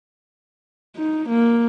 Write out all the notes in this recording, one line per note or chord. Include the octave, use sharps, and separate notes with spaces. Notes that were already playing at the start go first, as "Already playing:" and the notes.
D#4
A#3